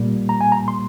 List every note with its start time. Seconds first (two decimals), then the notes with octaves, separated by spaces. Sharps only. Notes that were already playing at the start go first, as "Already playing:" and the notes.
Already playing: A#2 G3 A#3
0.29 A#5
0.41 G#5
0.52 A#5
0.68 C6